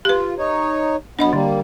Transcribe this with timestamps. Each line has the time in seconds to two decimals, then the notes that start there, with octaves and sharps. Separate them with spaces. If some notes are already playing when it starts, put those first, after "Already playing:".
0.05 F4 G4 B4
0.38 D#4 C#5
1.19 F#2 B3 D4 D#5 B5
1.33 D3 G3 A#3